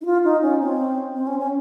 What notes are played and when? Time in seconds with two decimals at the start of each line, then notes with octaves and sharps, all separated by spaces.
0.01 D#4
0.05 F4
0.24 D#4
0.42 C#4
0.60 C4
1.15 C4
1.27 C#4
1.39 C#4